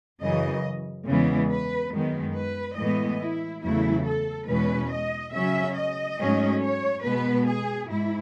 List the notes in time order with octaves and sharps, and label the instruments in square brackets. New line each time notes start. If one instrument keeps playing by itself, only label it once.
[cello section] F#2 C#3 E3 D#5
E2 C#3 E3 G#3 B3
B4
F#2 D#3 G#3 B3
B4
A2 E3 G#3 B3 D#5
E4
E2 C#3 F#3 A3 E4
A4
E2 B2 G#3 C#4 B4
D#5
C#3 F#3 C#4 E5
D#5
G#2 F#3 A3 C#4
C#5
B2 G#3 B3 B4
G#4
G#2 E4